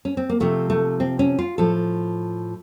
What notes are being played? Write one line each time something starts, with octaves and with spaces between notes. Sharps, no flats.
C#4
C4
A#3
C3 F3 A3
A3
C4
C#4
F4
A2 F3 A4